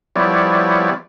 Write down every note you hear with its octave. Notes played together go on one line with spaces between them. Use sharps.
F3 G3 B3 E4 C#5 D5